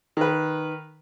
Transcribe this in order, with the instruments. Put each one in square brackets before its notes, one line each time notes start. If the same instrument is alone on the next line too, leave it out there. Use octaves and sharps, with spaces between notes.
[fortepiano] D#3 B4